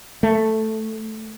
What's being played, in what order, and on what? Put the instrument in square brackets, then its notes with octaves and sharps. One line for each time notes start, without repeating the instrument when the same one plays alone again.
[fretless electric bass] A3